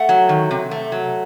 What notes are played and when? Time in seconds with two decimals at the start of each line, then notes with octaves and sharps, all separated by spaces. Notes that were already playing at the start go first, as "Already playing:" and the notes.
Already playing: A3 F#5
0.09 F#3
0.29 D#3
0.51 C3
0.71 A3
0.92 F#3